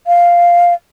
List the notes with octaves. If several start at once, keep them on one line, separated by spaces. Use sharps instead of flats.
F5